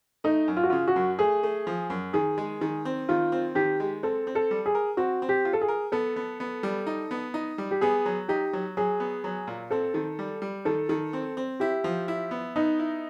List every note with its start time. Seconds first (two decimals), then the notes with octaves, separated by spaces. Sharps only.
0.24 A3 D#4
0.48 F#2
0.57 F4
0.63 F#4
0.70 C#3 F4
0.88 F#4
0.96 F#2
1.19 A3 G#4
1.43 A3
1.67 F3
1.90 F#2
2.13 D#3 G#4
2.38 G#3
2.61 D#3
2.85 C4
3.09 D#3 F4
3.32 C4
3.55 D#3 G4
3.80 G#3
4.03 C4 A4
4.27 C4
4.35 A4
4.51 G3
4.66 G#4
4.75 A#4
4.97 C4 F#4
5.22 C4
5.29 G4
5.45 F4
5.53 A4
5.61 G#4
5.68 A#4
5.92 B3 A4
6.16 B3
6.40 B3
6.63 G3
6.87 D#4
7.11 B3
7.34 D#4
7.58 G3
7.71 G4
7.81 B3 G#4
8.06 F#3
8.29 D#4 G4
8.53 F#3
8.77 F#3 G#4
9.00 B3
9.24 F#3
9.47 A#2
9.71 C4 A4
9.94 D#3
10.19 G3
10.42 G3
10.65 D#3 A4
10.89 D#3
11.13 C4
11.37 C4
11.60 E4 G4
11.84 F3
12.08 E4
12.31 B3
12.56 B3 D#4
12.79 E4